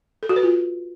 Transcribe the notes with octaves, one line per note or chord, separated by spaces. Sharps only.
A4
F#4
B4
F4